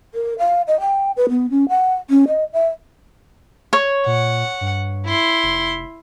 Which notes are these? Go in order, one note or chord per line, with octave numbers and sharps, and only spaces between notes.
A#4
F5
D#5
G5
B4
B3
C#4
F#5
C#4
D#5
E5
C#5
A#2 F#5
G2
E4 C6
F1